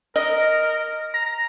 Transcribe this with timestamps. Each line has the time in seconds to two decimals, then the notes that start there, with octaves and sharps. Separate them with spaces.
0.16 A#4 D#5
1.14 A#5